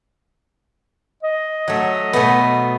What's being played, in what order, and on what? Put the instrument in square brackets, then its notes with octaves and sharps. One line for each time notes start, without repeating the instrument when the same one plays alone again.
[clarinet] D#5
[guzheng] F#3 A3
B2 A3 B3